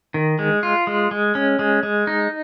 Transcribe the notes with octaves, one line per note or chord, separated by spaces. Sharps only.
D#3
G#3
F4
G#3
G#3
C#4
G#3
G#3
D#4